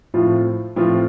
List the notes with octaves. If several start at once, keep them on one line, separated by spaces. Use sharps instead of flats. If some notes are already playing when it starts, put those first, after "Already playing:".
A2 F3 C4 F4
A2 F3 C4 F4